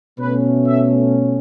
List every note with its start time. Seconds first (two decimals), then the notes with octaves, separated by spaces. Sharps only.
0.19 B2 A3 C#4 B4
0.66 E5